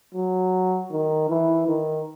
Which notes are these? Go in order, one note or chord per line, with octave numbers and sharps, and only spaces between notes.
F#3
D#3
E3
D#3